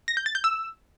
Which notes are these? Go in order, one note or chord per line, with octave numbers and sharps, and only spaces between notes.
A#6
G6
A6
G6
E6